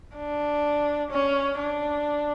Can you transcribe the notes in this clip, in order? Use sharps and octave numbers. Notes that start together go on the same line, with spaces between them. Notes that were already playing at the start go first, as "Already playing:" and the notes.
D4
C#4
D4